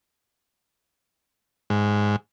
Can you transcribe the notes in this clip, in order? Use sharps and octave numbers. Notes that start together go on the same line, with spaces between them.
G#2